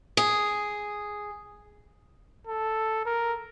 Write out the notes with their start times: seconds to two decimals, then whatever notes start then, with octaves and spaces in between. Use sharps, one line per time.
0.17 G#4
2.47 A4
3.06 A#4